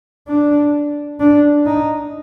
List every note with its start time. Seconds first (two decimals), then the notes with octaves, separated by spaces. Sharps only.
0.28 D4
1.20 D4
1.66 D#4